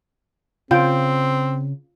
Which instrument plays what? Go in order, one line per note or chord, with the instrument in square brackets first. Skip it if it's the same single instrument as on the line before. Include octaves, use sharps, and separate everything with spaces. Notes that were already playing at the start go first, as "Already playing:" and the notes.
[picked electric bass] C#3 [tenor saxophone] C4 [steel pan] F4 G5